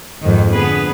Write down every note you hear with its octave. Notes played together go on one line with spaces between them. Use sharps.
F2 G#2 D#3
D3 B3 G#4 B4